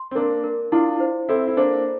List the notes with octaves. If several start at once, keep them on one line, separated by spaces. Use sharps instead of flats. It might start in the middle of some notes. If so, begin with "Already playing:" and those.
Already playing: C6
C4
A#3 D4 A#4
A#4
D4 E4 F4
C5
C4 E4 A4
E4
A#3 D4 C5